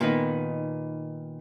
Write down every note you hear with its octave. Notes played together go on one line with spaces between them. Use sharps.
A#2 D#3 B3 D#4